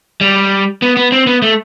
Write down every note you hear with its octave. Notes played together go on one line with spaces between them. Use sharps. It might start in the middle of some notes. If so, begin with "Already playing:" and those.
G3
B3
B3
C4
B3
A3